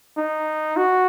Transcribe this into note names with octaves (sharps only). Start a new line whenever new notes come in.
D#4
F#4